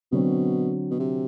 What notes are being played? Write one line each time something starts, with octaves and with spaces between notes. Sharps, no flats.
B2 D3 F#3 C4
B2
C3